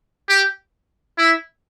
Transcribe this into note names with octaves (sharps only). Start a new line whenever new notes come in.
G4
E4